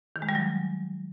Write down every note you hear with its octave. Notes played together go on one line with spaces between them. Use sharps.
D#3
G#3
G3
F#3